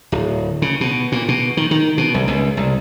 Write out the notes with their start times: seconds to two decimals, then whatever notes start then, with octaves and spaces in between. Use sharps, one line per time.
0.12 D1
0.62 C#3
0.81 B2
1.12 A#2
1.28 B2
1.57 D#3
1.71 D#3
1.98 B2
2.14 C2
2.28 C#2
2.57 C2